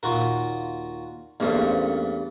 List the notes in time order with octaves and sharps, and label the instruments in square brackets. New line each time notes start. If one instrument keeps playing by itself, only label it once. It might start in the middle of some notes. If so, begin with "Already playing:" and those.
[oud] D#2 A#2 [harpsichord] F4 F#4 A#4
[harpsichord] E2 G2 A3 [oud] A#3 C#4 C5